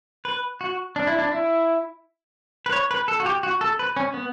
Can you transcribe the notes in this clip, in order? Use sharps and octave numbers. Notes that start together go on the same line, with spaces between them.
B4
F#4
D4
E4
D4
E4
B4
C#5
B4
A4
F#4
G4
F#4
A4
B4
C#4
B3